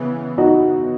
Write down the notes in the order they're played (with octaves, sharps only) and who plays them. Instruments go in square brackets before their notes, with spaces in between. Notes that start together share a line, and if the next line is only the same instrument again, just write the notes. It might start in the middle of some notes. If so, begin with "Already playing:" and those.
Already playing: [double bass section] C#3 E3 B3
[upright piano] D#4 F#4